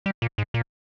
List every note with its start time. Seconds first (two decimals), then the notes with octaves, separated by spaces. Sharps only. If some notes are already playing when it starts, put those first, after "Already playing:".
0.06 G3
0.22 A#2
0.38 G#2
0.54 A#2